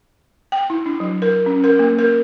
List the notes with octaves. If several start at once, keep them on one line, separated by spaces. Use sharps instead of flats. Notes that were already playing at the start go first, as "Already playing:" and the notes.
G5
E4
D4
F#3
A#4
C#4
A#4
A#3
A#4